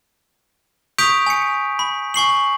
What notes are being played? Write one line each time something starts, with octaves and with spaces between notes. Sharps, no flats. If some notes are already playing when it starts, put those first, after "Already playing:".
C#6 D#6 G6 B6 D7 F7
G#5 C#7
B5
G#5 C#6 C7 F#7